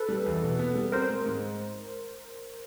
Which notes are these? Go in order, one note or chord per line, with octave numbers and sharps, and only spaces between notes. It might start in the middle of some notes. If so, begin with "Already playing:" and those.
Already playing: A4 B4
G3
E2
B2
B3
G3
C4 A#4 C5
G#3
G#2